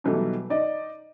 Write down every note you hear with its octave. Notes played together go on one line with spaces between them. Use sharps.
B2 D#3 E3 F#3 G3 A3
D#4 D5 D#5